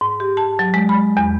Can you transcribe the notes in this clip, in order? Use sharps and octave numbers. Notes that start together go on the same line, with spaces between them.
G#2
G4
A5
F#3
G#3
B5
E2